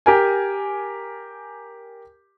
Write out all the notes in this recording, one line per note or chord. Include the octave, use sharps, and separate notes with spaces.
G4 A#4 G#5